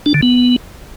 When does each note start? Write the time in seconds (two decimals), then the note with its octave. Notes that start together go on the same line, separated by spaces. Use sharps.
0.06 D4
0.14 D3
0.23 B3